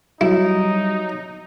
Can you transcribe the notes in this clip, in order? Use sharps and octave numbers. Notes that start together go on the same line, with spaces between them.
F#3 G3 D#4 E4